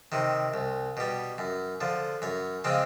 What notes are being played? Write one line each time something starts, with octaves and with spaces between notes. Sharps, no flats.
C3 D#3
C2
B2 G3
F#2
D3 F3
F#2 C#5
C#3 F3 G#3 C4